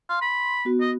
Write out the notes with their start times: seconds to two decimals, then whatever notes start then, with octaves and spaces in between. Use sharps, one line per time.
0.09 F5 C6
0.22 B5
0.65 B3 F#4
0.81 D#5